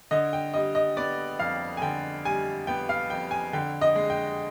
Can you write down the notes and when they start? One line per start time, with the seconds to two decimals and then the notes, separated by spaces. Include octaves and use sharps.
0.11 D3 D#5
0.33 G5
0.54 G3 D#5
0.75 D#5
0.96 B3 D5
1.39 F2 F5
1.77 G#5
1.82 D3 G5
2.25 G3 G#5
2.67 B3 G5
2.89 F5
3.10 F2 G5
3.31 G#5
3.53 D3 G5
3.81 D#5
3.96 G#3
4.10 G5